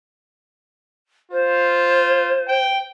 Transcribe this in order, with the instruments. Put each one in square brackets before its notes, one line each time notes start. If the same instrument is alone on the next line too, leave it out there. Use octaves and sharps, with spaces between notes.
[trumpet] F4 [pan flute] C5
[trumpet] G5